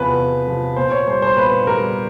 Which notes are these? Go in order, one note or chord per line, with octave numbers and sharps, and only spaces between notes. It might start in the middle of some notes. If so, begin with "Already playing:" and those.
Already playing: E2 C3 F3 B4
E2
C3 F3
A#2 C5
C#5
G3 C5
C5
A#2 B4
G3 A#4